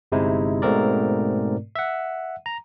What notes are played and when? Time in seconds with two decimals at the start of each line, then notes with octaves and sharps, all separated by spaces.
0.12 G1 C3 G#3 D#4 E4
0.62 G#2 B2 A3 C4 A#4 D5
1.75 E5 F#5
2.46 A#5